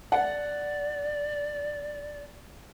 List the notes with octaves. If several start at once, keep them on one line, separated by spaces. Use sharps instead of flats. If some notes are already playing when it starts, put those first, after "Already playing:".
D5 F#5